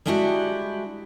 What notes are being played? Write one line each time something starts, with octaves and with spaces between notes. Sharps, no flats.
G3 G#3 D4 E4 F#4 G4